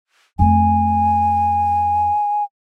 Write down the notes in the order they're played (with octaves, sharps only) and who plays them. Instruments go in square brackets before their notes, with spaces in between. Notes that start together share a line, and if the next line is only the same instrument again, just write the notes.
[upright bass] F2 A3 [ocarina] G#5